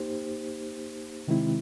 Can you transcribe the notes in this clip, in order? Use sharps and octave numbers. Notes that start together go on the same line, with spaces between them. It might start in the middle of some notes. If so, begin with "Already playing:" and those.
Already playing: A#3 D#4 G4 C5
C3 D#3 G#3 C4 E4